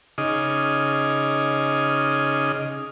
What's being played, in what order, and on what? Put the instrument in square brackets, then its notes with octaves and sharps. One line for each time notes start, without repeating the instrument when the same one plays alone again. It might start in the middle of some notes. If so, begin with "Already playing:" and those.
[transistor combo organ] C#3 D#4 G#4 D#5 D6 F6